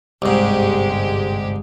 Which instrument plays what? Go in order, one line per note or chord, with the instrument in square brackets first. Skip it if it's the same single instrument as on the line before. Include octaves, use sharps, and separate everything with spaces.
[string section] G1 G#3 G4 [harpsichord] C2 G#2